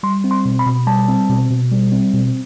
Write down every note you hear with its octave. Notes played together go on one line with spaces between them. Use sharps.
G3 C6
C4
C6
B2
B5
B2
G3 A5
C4
B2
B2
G3
C4
B2